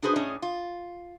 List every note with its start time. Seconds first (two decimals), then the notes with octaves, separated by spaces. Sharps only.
0.02 D4 F#4 G#4 B4 C5
0.16 A2 C#4 D4 G#4 C#5 D#5
0.42 F4